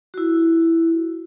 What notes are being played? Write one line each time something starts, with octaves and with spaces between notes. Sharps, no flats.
E4 F#4